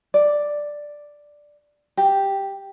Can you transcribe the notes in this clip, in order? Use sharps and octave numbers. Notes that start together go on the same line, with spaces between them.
D5
G4